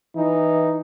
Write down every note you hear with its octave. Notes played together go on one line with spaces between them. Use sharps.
E3 D#4